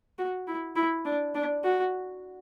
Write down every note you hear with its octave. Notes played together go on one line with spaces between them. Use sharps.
F#4
E4
E4
D4
D4
F#4